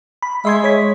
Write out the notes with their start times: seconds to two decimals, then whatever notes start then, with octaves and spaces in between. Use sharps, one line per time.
0.22 B5
0.45 G#3 E5 C6 G#6
0.64 C#5 B6